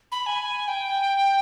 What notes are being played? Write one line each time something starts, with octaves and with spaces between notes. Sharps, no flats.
B5
G#5
G5